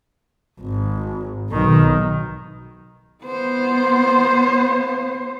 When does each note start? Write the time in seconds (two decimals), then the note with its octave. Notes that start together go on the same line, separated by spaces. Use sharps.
0.61 G#1
1.50 B1 D#3
3.24 B3 C5